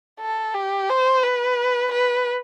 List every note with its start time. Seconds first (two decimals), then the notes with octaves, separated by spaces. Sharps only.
0.20 A4
0.54 G4
0.89 C5
1.23 B4
1.92 B4